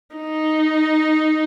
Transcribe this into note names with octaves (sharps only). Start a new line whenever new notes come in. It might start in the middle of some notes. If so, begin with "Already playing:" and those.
D#4